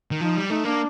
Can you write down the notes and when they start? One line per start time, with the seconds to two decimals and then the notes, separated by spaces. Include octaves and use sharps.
0.11 D#3
0.21 F3 D#4
0.36 G3
0.50 A3 D#4
0.65 A#3 D4